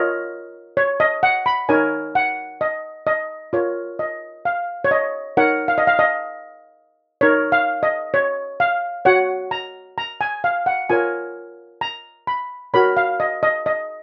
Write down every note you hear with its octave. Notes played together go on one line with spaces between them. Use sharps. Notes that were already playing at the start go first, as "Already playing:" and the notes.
Already playing: F4 A#4 C#5 D#5
C#5
D#5
F#5
B5
D#4 A#4 C#5 G#5
F#5
D#5
D#5
F4 A#4 C#5
D#5
F5
C#5
D#5
D#4 A#4 C#5 F#5
F5
D#5
F5
D#5
D#4 A#4 C#5
F5
D#5
C#5
F5
F#4 C#5 F#5
A#5
A#5
G#5
F5
F#5
F4 A#4 C#5 G#5
A#5
B5
F#4 A#4 C#5 B5
F5
D#5
D#5
D#5